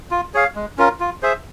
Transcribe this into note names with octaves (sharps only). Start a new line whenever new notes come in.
F4
G#4 C#5 F5
G#3
C#4 F4 A#4
F4
G#4 C5 E5